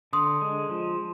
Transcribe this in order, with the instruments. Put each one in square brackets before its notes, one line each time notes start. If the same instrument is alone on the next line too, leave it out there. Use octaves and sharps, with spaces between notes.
[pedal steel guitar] D3 [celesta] C6 D#6
[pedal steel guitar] G#3
F3